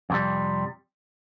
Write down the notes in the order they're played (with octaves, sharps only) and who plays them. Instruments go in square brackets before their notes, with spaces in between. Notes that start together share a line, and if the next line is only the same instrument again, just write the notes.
[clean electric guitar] F2 C3 G3